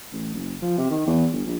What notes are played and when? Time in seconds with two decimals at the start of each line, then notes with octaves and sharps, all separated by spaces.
0.12 A1
0.35 F#1
0.62 F3
0.77 C3
0.90 D#3
1.07 E2
1.33 G1
1.46 A#1